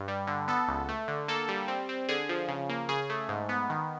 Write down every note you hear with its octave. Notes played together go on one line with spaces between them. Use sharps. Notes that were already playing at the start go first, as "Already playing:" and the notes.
Already playing: G2
G3
D3
B3 A4
C#2
A3
D3
A#3 A4
G3
C4
C4
D3 G#4
F3
C#3
A#3
C#3 G#4
A3
G#2
B3
D#3